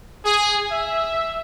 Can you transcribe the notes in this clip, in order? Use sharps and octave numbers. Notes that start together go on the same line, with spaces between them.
G#4
E5